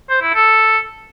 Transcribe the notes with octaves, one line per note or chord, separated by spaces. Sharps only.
C5
E4
A4